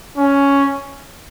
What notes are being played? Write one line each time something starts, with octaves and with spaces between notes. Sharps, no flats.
C#4